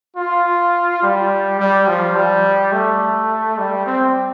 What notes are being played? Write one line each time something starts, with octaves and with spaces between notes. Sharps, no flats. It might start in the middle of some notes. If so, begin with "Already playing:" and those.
F4
G3
G3
F3
G3
A3
G3
C4